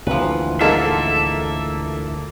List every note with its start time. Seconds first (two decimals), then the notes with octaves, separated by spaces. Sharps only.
0.07 D2 A#2 E3 F3 B4
0.61 G#2 A#3 F4 A4 E5